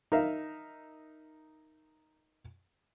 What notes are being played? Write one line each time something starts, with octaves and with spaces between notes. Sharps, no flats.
D#4 A#4 E5 F5